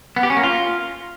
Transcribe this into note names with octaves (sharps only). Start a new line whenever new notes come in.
B3
G4
C#4
A#3
F4